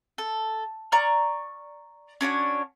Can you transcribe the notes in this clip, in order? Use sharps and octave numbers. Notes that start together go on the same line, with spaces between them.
A4
D5 A#5 C#6 F6
C#4 D4 F#4 C#5